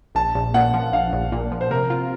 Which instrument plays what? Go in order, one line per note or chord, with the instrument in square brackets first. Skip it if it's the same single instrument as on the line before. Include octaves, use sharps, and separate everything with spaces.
[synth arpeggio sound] A#1 [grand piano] A5
[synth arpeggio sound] A#1
[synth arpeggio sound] A#2 [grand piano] F#5
[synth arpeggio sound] F3
[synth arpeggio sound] A#1 [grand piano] F5
[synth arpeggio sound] A#1
A#2
F3
[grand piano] C5
[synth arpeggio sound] C3 [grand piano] A#4
[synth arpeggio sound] F4